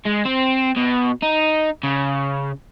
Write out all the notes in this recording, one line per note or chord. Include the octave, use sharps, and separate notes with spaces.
G#3
C4
B2
D#4
C#3